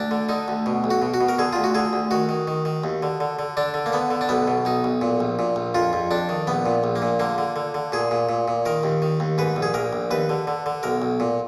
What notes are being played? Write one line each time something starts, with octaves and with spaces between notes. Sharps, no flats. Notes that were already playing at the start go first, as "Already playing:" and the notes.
Already playing: D2 D4
D3
D3 D#4
D2
B2
B1
F#4
B2
F#4
B2
A#4
D3 G#4
D2 F4
F#4
D3 G#4
D2
D#3 F#4
D#3
D#3
D#3
D#2
D3
D3
D3
D3 D4
D3
A#3
D3 B3
D3
D4
B1 B3
B2
B1 D#4
B1
A#2
A#1
A#2
A#1
F2 F4
F2
F2 D4
D#3
A#1 B3
A#2
A#1
A#3
A#2
D3 A#3
D3
D3
D3
A#2 G#4
A#2
A#2
A#2
D#3 A#4
D#2
D#3
D#2
G#2 B4
A#1
G#4
A#1 A#4
A#1
D#2 B4
D3
D3
D3
B1 A#4
B1
A#2